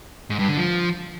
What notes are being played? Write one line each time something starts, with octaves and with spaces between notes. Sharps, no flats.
G#2
G2
D3
F3